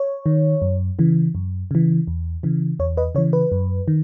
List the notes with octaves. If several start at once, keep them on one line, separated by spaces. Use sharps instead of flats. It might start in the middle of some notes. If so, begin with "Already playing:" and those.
Already playing: C#5
D#3
F#2
C#3 E3
F#2
C#3 E3
E2
C#3 E3
E2 C#5
B4 D#5
C#3 E3 C#5
B4
F#2
D#3